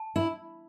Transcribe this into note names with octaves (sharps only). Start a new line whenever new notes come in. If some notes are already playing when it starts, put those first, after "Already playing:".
Already playing: A5
E4